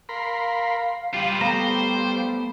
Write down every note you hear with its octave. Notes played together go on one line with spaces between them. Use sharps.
A#4 F5 B5 C6
G3 F4 B4
A3 B3 C5 A#5